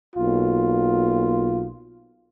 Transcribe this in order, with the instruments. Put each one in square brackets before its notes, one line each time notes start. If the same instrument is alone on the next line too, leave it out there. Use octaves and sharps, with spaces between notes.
[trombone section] B1 A#3 F4